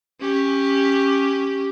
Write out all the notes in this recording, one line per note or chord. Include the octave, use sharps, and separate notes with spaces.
C#4 G4